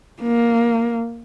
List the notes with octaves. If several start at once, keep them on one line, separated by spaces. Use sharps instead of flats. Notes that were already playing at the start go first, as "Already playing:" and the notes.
A#3